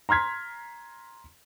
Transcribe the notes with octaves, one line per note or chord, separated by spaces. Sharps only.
A#5 C6 F6 G#6 B6